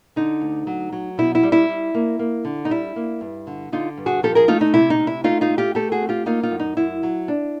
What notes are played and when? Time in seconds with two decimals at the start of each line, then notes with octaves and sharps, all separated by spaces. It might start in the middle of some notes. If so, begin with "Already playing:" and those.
0.16 D3 D#4
0.41 D2
0.67 F#3
0.92 F#3
1.18 B2 E4
1.35 E4
1.43 G3
1.52 E4
1.69 G3
1.94 A#3
2.19 A#3
2.45 D3
2.65 D#4
2.70 G3 E4
2.96 A#3
3.21 G2
3.47 D3
3.72 D3 D#4 F4
3.97 G2
4.06 F#4 G#4
4.23 F3 G4 A4
4.35 G#4 A#4
4.48 A3 D#4 F4
4.61 D#4
4.74 C3 E4
4.90 D#4
4.99 C3
5.07 E4
5.24 A3 D#4 F4
5.41 D#4 F4
5.50 A3
5.58 F4 G4
5.75 A3 G4 A4
5.92 F#4 G#4
6.01 C4
6.09 F4 G4
6.26 A#3 D#4 F4
6.43 D#4 F4
6.51 F#2
6.60 D#4
6.77 F#2 E4
7.03 F#3
7.28 D4